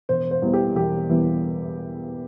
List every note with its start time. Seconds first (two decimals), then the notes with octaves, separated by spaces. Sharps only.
0.09 E1 C5
0.31 C5
0.42 E2 E3 G3
0.53 G4
0.76 E1 G4
1.09 E2 E3 G3